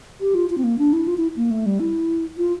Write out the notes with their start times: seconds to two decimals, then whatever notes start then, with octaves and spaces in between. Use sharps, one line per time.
0.21 G4
0.35 F4
0.50 F4
0.58 C4
0.64 A#3
0.78 D4
0.93 E4
1.07 F4
1.18 E4
1.36 A#3
1.51 A3
1.66 G3
1.80 E4
2.38 F4